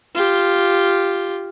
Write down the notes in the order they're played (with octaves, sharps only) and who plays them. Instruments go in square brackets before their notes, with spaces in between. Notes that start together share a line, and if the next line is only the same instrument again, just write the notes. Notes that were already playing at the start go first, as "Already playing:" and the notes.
[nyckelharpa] F4 G4